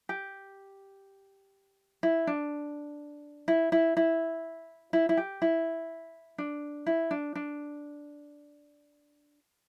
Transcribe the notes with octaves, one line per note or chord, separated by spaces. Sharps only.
G4
E4
D4
E4
E4
E4
E4
E4
G4
E4
D4
E4
D4
D4